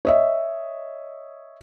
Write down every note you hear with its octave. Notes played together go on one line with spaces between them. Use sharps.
C#5 D#5 E5